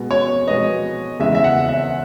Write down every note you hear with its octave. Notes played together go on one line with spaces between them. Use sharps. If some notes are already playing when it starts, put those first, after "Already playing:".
Already playing: B2 G#3 B3
C#5
B2 G#3 B3 D#5
E2 C#3 G#3 E5
E5
F#5
E5